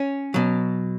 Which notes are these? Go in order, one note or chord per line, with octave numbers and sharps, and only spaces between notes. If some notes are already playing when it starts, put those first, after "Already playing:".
Already playing: C#4
B2 F#3